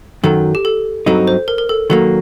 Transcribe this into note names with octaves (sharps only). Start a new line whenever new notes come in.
F#2 D#3 F#3 A4
G4
A4
G2 F#3 C4 D#4 A4
C5
A#4
A#4
A4
D#3 F#3 A#3 A4